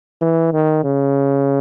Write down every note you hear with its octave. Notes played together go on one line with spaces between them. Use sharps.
E3
D#3
C#3